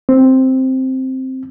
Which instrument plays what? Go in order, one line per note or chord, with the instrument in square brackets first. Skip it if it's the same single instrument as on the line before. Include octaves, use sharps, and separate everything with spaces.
[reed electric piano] C4